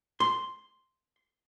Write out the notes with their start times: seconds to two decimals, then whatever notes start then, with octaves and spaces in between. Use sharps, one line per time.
0.20 C6